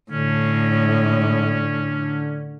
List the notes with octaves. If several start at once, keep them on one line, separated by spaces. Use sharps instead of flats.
A2 D3 C#4